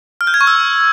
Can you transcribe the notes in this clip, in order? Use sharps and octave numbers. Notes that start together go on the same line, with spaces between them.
F6
G6
G#6
C#6
E6